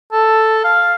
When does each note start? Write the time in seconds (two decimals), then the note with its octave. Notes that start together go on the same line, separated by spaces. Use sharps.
0.12 A4
0.64 F5